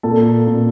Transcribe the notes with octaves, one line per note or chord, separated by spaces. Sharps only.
A#2 A4
A#2